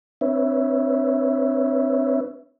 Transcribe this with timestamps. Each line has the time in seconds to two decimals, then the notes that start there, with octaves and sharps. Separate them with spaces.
0.21 C4 D4 B4 C#5 E5